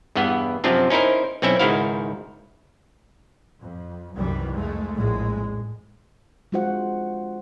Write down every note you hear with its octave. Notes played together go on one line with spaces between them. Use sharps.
E2 G2 E3 B3
F#2 C3 F3 C4 D4 F4
C#4 D#4 E4 A#4 C5
B1 C4 C#4 E4 E5
C#2 G#2 D#3 E4 F#4 F5
F2
C2 F#2 D#3 E3 G3
F2 G#3 A3
A#1 F2 A2 G#3
G#3 D4 F4 F#4 C5 F#5